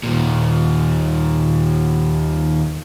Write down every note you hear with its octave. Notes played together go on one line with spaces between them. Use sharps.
D#2 A#2